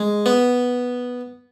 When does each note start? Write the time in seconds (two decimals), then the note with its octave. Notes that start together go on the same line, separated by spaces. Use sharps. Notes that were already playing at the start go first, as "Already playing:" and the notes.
Already playing: G#3
0.26 B3